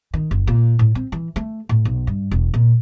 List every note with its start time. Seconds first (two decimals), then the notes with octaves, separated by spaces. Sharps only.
0.14 D#3
0.31 F#1
0.47 A#2
0.79 A2
0.95 C4
1.12 E3
1.36 A3
1.69 A2
1.85 B1
2.07 G2
2.31 E1
2.54 A#2